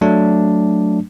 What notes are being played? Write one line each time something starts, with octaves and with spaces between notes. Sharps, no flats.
F#3 A3 D4